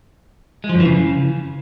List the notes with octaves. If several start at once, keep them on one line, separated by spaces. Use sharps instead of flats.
G#3
F3
F#2
E3
C#3